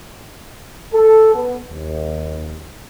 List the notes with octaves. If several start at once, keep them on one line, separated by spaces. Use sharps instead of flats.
A4
B3
D#2